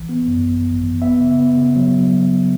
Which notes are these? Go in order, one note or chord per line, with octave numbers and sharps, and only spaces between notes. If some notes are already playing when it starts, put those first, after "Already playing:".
Already playing: A1 E3
B3
F#2
G#1
G#1
E3
B3 E5
C#3
B3
C#3
F#3